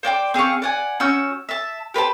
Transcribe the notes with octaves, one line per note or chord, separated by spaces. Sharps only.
C5 D5 G5 D6
C4 G#4 F5 C#6
D5 F#5 G#5
C#4 F#4 E6 G6
E5 A5
G4 B4 C5 A5